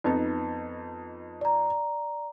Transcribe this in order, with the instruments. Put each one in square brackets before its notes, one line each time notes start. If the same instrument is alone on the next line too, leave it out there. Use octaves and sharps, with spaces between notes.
[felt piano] F2 B3 D#4
[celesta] D5 A#5